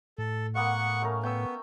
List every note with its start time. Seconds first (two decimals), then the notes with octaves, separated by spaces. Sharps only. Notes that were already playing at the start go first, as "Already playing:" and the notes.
0.18 A2 A4
0.55 A#3 B3 F5 F#5 C#6
1.02 A3 C#4 A#4
1.23 B3 G5 C#6 E6